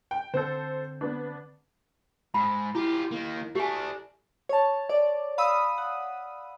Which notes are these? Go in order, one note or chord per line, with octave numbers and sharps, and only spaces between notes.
G5
D3 C4 A4 C5 G6
B3 D4
G#2 B5
E4 F4 G4
D#3 A#3
A3 D4 G4 G#5
C#5 A5
D5
F5 B5 D#6 E6
F#5